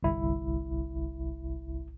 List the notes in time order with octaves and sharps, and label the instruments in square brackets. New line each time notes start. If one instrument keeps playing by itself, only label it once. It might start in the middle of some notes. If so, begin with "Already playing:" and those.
[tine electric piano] G1 C2 E4